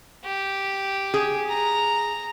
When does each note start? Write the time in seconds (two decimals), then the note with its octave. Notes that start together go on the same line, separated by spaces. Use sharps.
0.25 G4
1.14 G#4
1.49 A#5